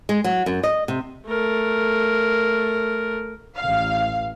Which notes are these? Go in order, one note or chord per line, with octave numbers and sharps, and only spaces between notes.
G#3
F#3
F#2
D#5
C3
A3 A#4
A1 F5